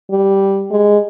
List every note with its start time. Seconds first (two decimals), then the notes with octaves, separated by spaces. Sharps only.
0.10 G3
0.71 G#3